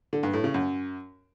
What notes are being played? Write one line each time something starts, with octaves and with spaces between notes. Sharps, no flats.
D3
G2
A2
C#3
F#2